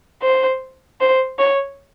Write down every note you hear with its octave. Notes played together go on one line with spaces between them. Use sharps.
C5
C5
C#5